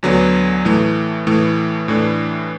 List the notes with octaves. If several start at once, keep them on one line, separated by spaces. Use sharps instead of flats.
D2 D3 F#3 B3
A2 E3 A3
A2 E3 A3
A2 E3 A3 D4